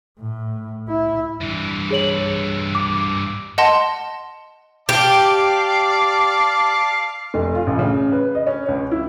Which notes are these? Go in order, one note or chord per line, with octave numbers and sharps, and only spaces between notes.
A2
E4
G2 E3
G#4 C#5 F#7
D6
D#5 F#5 A5 C6 A#6
G4 D5 F5 A5
F1
F4
A1
C#3
B4
D#5
C#4
C#2
E4